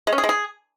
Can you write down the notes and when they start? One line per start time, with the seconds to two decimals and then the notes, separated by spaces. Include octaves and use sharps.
0.07 G#3
0.13 C#4
0.18 G#4
0.23 G#3
0.29 G#4